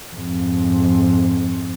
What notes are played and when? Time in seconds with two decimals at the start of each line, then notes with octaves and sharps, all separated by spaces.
0.15 F2 G#2